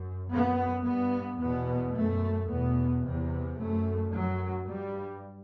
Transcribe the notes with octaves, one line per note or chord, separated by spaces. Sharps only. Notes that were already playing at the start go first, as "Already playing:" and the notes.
Already playing: F#2
F#2 B3
G2 B3
E2 B2 B3
F#2 A3
E2 B2 B3
E2 C3
F#2 A3
F#2 F#3
G2 G3